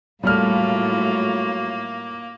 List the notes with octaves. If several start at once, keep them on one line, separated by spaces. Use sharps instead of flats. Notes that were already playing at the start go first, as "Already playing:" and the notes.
A2 F#3 G3 A3 A#3 F4 F6